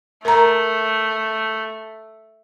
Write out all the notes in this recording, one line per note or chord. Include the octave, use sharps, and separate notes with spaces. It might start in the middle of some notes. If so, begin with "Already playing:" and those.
A3 A#4 A#5